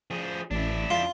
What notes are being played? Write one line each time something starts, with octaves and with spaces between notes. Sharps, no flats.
F3 G#4
A1 D4 E4
F2 F4